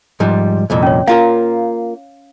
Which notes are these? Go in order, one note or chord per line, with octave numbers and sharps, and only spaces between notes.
G#2 F3 G3
C2 F2 A#2
C#4 C#5
A#3 F4 A#4 F5